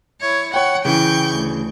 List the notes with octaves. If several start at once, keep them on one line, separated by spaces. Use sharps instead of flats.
E4 C#5
C#5 F#5 G5
C#3 E3 G5 C#6 G6
D2